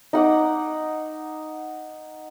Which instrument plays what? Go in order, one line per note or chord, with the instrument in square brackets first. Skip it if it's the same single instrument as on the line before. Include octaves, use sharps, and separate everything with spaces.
[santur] D#4 F#5 D6